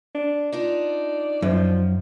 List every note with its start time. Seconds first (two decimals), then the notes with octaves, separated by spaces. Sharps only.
0.15 D4
0.52 D4 D#4 F4 D5
1.42 F#2 F3